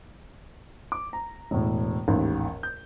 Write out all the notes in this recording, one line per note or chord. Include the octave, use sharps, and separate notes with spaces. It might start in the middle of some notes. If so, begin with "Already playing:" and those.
D6
A#5
E1 A2
A1 D#2 G#2
G6